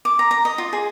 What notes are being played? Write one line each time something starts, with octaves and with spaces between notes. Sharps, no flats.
D6
A#5
A#5
D#5
F4
G#4